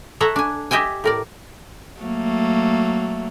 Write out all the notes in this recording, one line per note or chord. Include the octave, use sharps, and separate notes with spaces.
A4 C#5 E5 F#5 A#5
D4 G#5
G4 D#5 E5 G5 G#5
A2 A#4 D5
F#3 A3 A#3